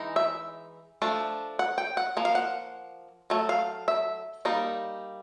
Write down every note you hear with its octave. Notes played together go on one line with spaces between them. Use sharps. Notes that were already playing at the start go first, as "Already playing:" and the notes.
Already playing: E3 G#3 D#4
E5
F3 A3 D4
F#5
G5
F#5
F3 A#3
F5
F#5
F#3 A3
F5
E5
G3 A#3 D#4